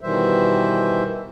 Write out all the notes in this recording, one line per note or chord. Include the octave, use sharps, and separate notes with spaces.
B2 D#3 E3 G3 C5 E5